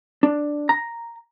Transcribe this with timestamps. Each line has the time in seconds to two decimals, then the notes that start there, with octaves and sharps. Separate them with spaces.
0.23 D4
0.69 A#5